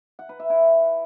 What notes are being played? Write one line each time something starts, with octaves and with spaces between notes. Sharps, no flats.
F#5
B4
E5
E4